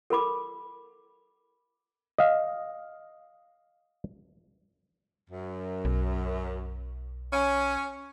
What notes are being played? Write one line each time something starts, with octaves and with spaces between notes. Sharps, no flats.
A4 A#4 B5 D6
D#5 F5
F#2
B1
C#4